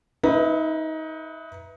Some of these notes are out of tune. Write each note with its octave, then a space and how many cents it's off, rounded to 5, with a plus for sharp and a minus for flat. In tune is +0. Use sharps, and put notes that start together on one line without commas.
D#4 +25 B4 +0 E5 +0